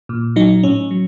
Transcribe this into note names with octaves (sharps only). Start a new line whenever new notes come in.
A#2
F#3 D#4
A2 C#4
F#3